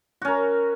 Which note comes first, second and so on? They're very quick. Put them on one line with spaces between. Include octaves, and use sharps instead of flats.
F#4 C#4 A#4